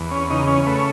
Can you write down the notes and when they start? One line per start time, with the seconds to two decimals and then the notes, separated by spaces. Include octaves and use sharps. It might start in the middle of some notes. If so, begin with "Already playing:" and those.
Already playing: E2
0.11 C#4
0.30 C#3 D#4
0.47 C#4
0.67 A3 B4
0.75 C#5